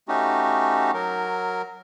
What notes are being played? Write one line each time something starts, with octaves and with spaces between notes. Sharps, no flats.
A3 C#4 D#4 F#4 G4
F#3 A#4